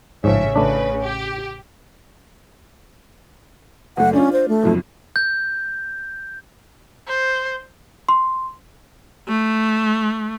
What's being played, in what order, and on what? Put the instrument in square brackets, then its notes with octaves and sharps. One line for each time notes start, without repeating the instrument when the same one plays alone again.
[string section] A1 C#3 E5 [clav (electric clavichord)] G#2 F3 [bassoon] C#4
[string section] A1 C#3 B4 [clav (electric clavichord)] A3 D4
[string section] G4
[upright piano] F#1 A3 [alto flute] F#5
[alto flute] C#4 [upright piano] D4 F4
[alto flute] C5
A3
[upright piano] F#1 B1 F2
[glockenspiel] G6
[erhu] C5
[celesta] C6
[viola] A3